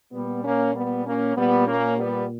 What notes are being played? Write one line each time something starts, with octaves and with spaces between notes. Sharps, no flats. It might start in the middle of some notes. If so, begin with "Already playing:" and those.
A#2 G3 B3
A#3 C#4
G3 B3
A#3 C#4
A#2 G3 B3
A#3 C#4
G3 B3